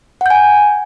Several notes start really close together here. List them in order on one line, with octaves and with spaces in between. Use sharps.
F#5 G6 G#5